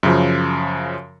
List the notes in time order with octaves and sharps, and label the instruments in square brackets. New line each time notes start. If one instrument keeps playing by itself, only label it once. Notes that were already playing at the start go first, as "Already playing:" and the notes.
[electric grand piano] F#2 C#3 F3